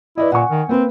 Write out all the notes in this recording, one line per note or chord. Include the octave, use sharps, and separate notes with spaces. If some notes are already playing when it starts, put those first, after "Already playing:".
E4 B4 D5 D#5
A#2 F#5 G#5 C#6
D#3
A#3 C4 B4